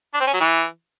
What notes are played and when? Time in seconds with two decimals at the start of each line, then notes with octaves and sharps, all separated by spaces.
0.14 D4
0.20 C4
0.27 C#4
0.34 F#3
0.40 E3